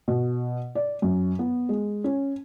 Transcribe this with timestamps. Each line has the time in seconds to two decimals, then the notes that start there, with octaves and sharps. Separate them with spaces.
0.08 B2
0.75 D5
1.02 F#2
1.39 B3
1.69 G#3
2.04 C#4